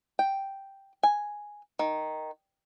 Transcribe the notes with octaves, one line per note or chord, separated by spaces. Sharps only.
G5
G#5
D#3